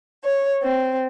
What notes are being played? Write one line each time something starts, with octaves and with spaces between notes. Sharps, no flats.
C#5
C4